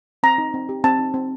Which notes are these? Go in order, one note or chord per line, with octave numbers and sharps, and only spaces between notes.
C4 A#5
D#4
C4
G4
C4 A5
D#4
C4